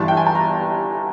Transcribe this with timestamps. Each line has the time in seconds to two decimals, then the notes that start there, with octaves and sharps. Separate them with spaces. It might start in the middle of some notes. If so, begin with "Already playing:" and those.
Already playing: G1 G2 E3 A5
0.08 G5
0.17 G#5
0.26 A5
0.35 A#5